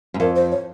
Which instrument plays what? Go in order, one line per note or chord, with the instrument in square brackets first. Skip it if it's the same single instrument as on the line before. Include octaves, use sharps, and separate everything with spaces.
[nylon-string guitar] F#2
[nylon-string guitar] F2 [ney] A#4
[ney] C5
C#5